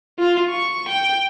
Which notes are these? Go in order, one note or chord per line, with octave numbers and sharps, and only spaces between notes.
F4
C#6
G5